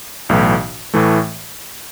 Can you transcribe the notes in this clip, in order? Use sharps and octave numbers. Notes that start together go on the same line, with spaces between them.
B1 A2 E3
A2 E3 A3